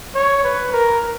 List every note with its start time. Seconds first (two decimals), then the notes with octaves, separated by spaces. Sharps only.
0.15 C#5
0.43 B4
0.72 A#4